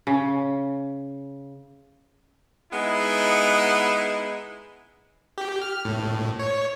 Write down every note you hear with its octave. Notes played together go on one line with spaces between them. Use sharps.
C#3
G#3 B3 D#4 E4
G4
F6
A2
C#5